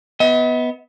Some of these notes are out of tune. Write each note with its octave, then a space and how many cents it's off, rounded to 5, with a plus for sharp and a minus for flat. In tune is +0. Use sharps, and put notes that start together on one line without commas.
B3 +0 D#5 +40